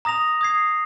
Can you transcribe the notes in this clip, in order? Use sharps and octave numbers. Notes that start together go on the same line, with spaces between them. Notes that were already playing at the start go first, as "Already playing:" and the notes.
A#5 D#6 A#6 F7
D#6 G#6 C7